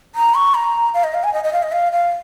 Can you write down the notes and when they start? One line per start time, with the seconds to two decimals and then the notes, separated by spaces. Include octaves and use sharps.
0.15 A#5
0.35 C#6
0.54 A#5
0.94 F5
1.04 D#5
1.14 F5
1.24 G#5
1.34 D#5
1.44 D#5
1.53 F5
1.63 D#5
1.72 F5
1.92 F5